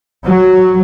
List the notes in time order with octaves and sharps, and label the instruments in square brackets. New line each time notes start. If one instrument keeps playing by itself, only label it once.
[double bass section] F#3